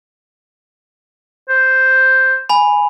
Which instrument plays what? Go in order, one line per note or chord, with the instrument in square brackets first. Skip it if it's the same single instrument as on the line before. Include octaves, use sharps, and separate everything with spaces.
[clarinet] C5
[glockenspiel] G#5 B5